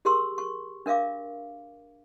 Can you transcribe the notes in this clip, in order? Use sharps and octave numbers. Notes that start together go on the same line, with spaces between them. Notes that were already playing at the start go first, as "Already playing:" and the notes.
G4 G#4 A#4 C6 C#6 E6
C#6
D4 A#4 E5 F5 D6